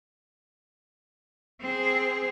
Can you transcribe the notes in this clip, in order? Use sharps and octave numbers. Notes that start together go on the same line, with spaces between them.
C4 G#4